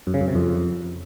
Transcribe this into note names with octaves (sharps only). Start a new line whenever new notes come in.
F#2
C#3
F#2
C3
F2